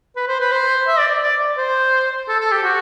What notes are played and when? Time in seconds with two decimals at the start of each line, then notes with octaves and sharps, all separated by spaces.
0.16 B4
0.28 C5
0.40 B4
0.52 C5
0.88 E5
0.99 D5
1.23 D5
1.58 C5
2.29 A4
2.40 A4
2.52 G4
2.64 F#4